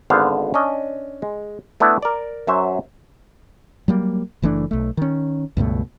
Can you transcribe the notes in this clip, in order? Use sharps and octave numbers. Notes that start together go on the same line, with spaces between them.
G#1 D3 B3 C5 F5
C#4 D4 D#5
G#3
A3 B3 D4 E4
A#4 D5
F#2 F#3 C5 E5
F#3 G3 A#3
F#1 E3 A3 D4
B1 A3
D#3 C#4
C#2 G2 B2 A3